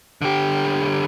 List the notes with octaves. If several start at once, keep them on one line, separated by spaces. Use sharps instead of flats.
D3 G4